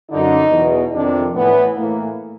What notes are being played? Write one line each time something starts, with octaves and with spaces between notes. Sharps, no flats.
F#2 D3 D#4
E2 B2
F2 C3 D#3 D4
A2 E3 B3
A2 E3 A#3